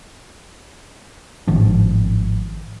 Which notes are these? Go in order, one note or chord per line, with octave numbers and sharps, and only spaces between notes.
G#1 A2 D#3 F3